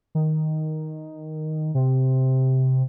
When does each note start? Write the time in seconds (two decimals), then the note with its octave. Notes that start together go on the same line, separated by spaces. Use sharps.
0.15 D#3
1.75 C3